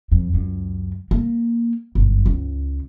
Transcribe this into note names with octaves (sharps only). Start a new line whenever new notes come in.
F2
C#2 F#2
A#3
G1 F#2
C#2